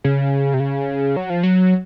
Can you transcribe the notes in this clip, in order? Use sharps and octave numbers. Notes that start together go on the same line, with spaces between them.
C#3
C3
C#3
F#3
F3
F#3